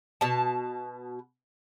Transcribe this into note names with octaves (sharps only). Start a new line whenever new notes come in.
B2 A5